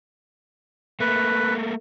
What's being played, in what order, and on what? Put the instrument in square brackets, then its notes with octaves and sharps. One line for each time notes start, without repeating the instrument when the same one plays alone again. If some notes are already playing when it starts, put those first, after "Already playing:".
[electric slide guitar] A3 A#3 [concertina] B4